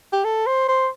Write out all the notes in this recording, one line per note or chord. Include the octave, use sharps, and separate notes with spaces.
G4
A4
C5
C5